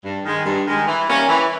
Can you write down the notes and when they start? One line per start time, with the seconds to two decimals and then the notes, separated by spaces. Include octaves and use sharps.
0.05 G2
0.25 D#3 G#3
0.45 G2
0.67 D#3 G#3
0.87 E3
1.08 G3 A#3 C#4
1.28 E3